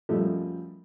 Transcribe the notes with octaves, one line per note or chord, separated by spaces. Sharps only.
F#2 F3 G3 A3 D#5